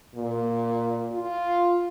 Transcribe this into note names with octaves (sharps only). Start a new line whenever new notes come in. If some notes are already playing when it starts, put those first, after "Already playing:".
A#2
F4